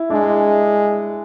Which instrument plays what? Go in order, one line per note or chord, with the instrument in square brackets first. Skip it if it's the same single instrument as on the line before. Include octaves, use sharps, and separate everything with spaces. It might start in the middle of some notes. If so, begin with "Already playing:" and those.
Already playing: [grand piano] E4
[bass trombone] G#3 [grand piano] D4 E4